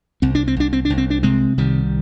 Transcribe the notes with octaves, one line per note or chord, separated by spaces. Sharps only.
C2 C4
D4
C4
C2 D4
C4
D4
C2
C4
D4
C3 G#3 C4
C2 D#3 G3